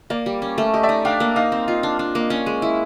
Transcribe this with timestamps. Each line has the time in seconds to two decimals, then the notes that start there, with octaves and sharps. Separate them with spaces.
0.10 A#3 D5
0.26 G3
0.42 C#4
0.58 A3
0.73 G4 D#5
0.83 D5 E5
0.89 D#4
1.05 D4 F5 G5
1.20 A#3
1.36 D#4 D#5 F5
1.52 C4
1.68 F4 D#5
1.83 D4
1.99 D4
2.15 A#3
2.20 D#5
2.30 C#4 D5
2.46 G#3
2.62 E4 D#5